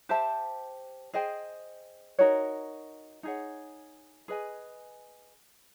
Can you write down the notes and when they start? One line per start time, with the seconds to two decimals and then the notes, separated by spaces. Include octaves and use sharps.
0.09 G4 C5 E5 A5
1.14 G#4 C5 D#5 G5
2.19 D#4 F#4 A#4 C#5
3.23 D#4 G#4 C#5 F#5
4.28 G#4 B4 D#5 G#5